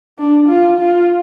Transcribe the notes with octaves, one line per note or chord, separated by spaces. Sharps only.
D4
F4
F4